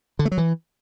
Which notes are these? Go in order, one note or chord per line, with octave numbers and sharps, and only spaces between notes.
D3
A3
F#3
E3